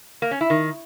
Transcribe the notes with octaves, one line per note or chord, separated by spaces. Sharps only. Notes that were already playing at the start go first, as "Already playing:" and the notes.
A#3
C#4
E4
D#3